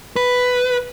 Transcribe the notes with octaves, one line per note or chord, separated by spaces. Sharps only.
B4